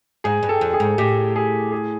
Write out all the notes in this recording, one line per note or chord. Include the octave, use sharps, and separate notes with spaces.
G#2 G#4
G2
A4
F2
G#4
G#2
A2 G4
G#4
G#4